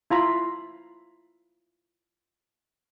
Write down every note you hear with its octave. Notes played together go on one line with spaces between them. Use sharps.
E4 F4 A#5 B5